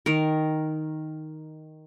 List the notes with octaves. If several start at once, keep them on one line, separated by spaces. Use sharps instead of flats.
D#3 A#4